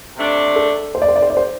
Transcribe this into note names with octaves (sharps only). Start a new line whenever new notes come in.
C3 A3 D4
A4
C5
D5
C5
D5
C5
D5
C5